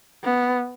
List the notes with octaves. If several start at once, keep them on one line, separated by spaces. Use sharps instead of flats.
B3